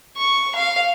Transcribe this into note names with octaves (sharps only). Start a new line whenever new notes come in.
C#6
F5